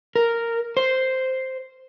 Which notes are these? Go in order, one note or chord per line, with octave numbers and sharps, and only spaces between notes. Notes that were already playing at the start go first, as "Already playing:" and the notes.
A#4
C5